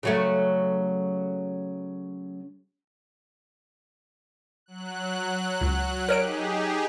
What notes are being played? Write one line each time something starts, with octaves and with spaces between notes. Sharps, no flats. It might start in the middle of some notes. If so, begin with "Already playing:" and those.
C#3 F#3 A3
F#3 F#6
C#2
D#4 G4 G#4 A#4 C#5 D7